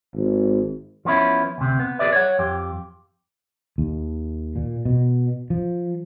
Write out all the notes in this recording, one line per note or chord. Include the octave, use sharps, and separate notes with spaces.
G#1
F3 B3 C#4 E4
D2 C3
B3
F#4 G#4 A#4 B4 D5 E5
C#5 F#5
F2 G4
D#2
A#2
B2
F3